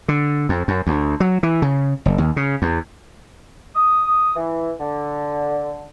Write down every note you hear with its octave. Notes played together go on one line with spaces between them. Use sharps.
D3
F2
F#2
D2
F#3
E3
C#3
F#1
D#2
C#3
E2
D#6
E3
D3